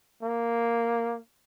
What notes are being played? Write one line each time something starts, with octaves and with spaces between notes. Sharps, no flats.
A#3